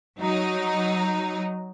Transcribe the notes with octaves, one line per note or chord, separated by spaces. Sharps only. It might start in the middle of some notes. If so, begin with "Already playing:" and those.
F#3 D#4